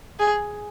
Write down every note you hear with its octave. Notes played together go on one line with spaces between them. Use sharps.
G#4